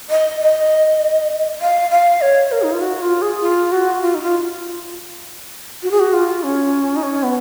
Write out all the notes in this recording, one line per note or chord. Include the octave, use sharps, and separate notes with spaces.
D#5
D#5
F5
F5
C#5
A#4
D#4
F4
F#4
F4
G#4
F4
F#4
F4
D#4
F4
F#4
G#4
F#4
F4
C#4
D#4
C#4
B3